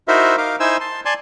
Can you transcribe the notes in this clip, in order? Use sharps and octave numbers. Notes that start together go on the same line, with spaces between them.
D#4 E4 F#4 A#4 C5 E5
D#4 A#4 F5 D6
D#4 E4 C5 G#5 E6
A5 C6
D5 G#5 A5 C6